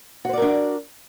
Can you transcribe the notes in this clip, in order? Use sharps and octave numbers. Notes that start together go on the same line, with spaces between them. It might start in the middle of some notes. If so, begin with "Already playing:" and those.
D4 F#4 A#4 C5 D5